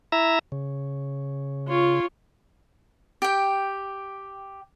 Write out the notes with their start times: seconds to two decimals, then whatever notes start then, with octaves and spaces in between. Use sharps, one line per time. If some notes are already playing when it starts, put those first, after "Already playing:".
0.12 E4 E5 A#5
0.52 C#3
1.68 F4 C#5
3.22 G4 G5